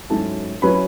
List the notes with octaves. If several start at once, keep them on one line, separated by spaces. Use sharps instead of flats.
G#2 F#3 C#4 E4 A4 A5
F#3 C#4 E4 B4 B5